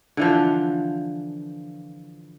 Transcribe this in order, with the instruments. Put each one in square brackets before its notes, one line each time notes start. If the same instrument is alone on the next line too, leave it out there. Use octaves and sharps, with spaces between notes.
[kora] D3 E3 F3